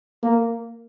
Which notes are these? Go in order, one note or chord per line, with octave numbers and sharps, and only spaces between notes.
A#3